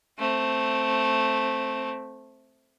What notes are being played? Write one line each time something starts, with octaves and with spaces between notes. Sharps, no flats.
A3 C4